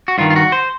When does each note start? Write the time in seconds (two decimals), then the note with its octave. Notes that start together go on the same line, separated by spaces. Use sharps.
0.08 F#4
0.18 G2 D#3 F4
0.30 F4
0.36 F#4
0.52 C5